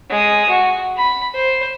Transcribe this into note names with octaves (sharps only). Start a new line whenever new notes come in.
G#3 D#6
F#4
B5
C5